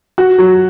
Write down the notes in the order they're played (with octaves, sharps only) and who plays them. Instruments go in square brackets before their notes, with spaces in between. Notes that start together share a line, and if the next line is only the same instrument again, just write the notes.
[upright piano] F#4
F#3